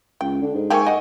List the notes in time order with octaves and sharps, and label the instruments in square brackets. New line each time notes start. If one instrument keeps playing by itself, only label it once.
[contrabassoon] C#2 [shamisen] G5
[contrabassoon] D3
G#2
[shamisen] A3 A#3 G4 [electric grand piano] G5 G#5 C#6
[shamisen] G4 F#5 [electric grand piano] D#5